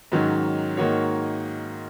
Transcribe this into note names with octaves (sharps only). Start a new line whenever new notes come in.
G#2 D#3 F#3 C#4
G#2 D#3 A#3 F#4 C#5